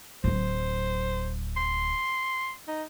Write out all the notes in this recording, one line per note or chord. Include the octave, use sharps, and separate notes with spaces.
D1 F#3 C5
C6
D#4